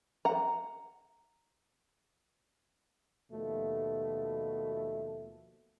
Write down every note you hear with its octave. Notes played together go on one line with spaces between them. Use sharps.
F#5 A#5
D#2 B2 F3 A3